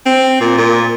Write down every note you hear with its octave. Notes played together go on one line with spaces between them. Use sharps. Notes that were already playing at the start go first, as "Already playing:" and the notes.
C4
A#2
A#2